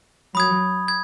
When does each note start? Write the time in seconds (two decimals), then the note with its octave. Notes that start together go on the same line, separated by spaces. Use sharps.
0.35 F#3 B5 D#6 G#6
0.88 G#6